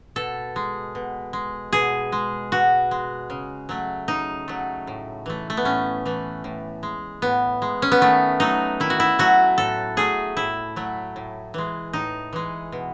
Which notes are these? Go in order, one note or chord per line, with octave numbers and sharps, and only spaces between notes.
B2 A4
G#3
B2
G#3
B2 G#4
G#3
B2 F#4
G#3
C#3
F#3 A3
C#3 D#4
F#3 A3
A2
E3 A3
A3
B3
A2 C#4
E3 A3
A2
G#3
A2 B3
G#3
C#4
B3
D#3 A3
F#3 A3 D#4
D#3 E4
F#4
E4
F#3 A3 F#4
A2 A4
F#3 A3 G#4
A2 E4
F#3 A3
A2
E3 G#3
A2 D#4
E3 G#3
B2